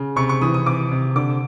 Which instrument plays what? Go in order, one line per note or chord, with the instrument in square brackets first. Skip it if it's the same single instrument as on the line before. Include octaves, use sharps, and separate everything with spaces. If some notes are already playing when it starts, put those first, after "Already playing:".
Already playing: [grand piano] C#3
[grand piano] C3 [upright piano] C#6
[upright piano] C#6
[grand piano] E3 [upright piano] D#6
[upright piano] D#6
[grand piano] C3 [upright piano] D6
[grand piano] C3
[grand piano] D3 [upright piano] D6